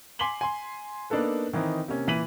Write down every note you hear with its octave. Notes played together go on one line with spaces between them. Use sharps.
G#5 C6 D6 B6 F#7 G7
G#5 C6
A#3 B3 D4 D#4 A4 B4
D#3 E3 C4 D#4
C3 A#3 C#4
A#2 E3 B6 D#7 F#7